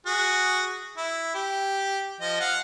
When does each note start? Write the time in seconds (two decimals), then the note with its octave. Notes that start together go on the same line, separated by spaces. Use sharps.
0.06 F#4 G#4
0.97 E4
1.35 G4
2.21 F3 D#5
2.40 F5 F#5